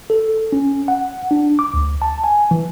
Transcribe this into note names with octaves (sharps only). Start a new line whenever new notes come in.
A4
C#4
F#5
D4
D6
D2
A5
G#5
E3